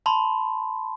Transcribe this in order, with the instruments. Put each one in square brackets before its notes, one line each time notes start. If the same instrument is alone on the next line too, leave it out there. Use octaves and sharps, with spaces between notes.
[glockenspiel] A5 B5 C6